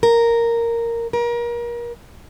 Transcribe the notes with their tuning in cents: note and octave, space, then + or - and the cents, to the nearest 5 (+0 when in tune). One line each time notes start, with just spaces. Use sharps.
A#4 -5
A#4 +30